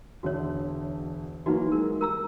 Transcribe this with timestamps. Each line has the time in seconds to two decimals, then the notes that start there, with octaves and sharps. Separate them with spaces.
0.23 E1 D3 F#4 C#5 E5
1.46 E3 F#3 A#3 D#4 F#4
1.72 G#3 A#4
2.01 G3 A#4 A#5 E6